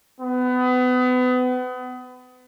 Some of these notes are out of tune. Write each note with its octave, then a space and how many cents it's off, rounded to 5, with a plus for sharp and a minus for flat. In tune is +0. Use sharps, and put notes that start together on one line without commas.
B3 +30